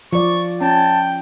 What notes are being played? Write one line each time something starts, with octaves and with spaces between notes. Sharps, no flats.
F3 D5 C#6
C#4 G5 A5